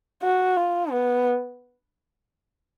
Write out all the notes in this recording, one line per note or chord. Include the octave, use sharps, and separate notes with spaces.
F#4
F4
B3